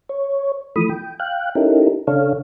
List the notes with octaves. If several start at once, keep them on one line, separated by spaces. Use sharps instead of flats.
C#5
E3 F3 A3 B5 D#6
G5
F5 G5 F#6
C#4 D#4 E4 G4 A4 A#4
C#3 D4 A4 C#5 F5